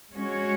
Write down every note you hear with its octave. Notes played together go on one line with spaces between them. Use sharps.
G#3 C#4 F#4 C#5